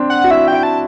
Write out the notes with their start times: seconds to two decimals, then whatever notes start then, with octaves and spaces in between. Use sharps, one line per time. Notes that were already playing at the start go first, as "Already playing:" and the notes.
Already playing: C4 D4
0.10 F#5
0.24 F#4
0.31 E4 E5
0.48 E4 G5
0.63 A5